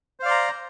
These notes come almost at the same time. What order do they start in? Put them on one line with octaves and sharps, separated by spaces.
C5 F5 D5 C6 A#5